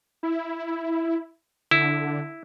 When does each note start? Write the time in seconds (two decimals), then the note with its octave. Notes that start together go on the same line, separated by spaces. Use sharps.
0.23 E4
1.71 D3 E4